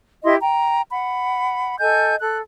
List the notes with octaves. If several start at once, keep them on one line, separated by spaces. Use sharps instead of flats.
E4 G4 D#5 C6
G5 A#5
F#5 B5
A4 D#5 G#5 G6
A4 F#6